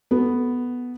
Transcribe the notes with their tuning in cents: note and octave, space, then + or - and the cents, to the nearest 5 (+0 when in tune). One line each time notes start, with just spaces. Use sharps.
B3 +0 F#4 +25 A4 +0